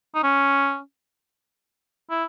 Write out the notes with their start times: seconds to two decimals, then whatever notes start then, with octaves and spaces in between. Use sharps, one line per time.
0.15 D#4
0.23 C#4
2.10 E4